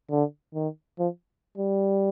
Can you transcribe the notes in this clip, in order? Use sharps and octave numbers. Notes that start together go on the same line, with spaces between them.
D3
D#3
F3
G3